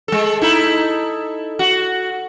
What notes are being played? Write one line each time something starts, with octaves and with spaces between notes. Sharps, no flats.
G#3 A4
D#4 E4 A4
F#4